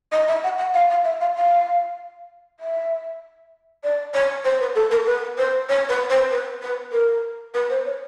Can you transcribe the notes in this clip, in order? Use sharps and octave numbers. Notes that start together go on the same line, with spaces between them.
D#5
E5
F#5
F#5
F5
F5
E5
F5
F5
E5
D5
C#5
C5
B4
A4
A#4
B4
C5
C#5
B4
C5
B4
B4
A#4
B4
C5
C#5